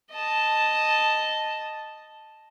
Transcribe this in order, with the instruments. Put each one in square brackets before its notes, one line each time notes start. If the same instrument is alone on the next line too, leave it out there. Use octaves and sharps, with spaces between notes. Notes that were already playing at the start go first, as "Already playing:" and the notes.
[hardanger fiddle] D#5 A5